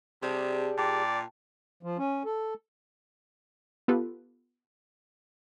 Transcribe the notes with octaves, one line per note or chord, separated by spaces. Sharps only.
C3 G3 D4 G#4
A#2 D5 G5 A5
F3
C#4
A4
B3 F4 G4 A4 B4